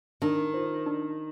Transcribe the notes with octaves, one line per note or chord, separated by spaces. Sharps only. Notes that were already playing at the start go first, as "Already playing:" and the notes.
D#3 D4
F4 C5
D4